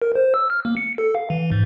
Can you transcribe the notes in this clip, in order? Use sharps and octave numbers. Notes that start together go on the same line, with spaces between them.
A#4
C5
E6
F6
A#3
C#7
A4
F5
E3
G#2